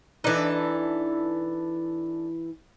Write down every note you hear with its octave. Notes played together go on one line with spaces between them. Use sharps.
E3 D4 D#4 A4